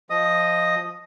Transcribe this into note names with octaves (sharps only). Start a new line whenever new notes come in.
F3 D#5 D#6